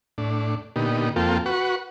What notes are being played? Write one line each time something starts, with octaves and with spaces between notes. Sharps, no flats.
A2 D4
A#2 D3 B3 D#4 G4
F2 A#3 C4 F4 A4 G5
F#4 B4 F#5 C#6